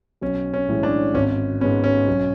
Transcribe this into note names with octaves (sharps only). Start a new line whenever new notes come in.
B1 C#4
C#4
A2 E3 G#3
D4
G#1 C#4
G#2 G#3 B3 C#4
C#4
B1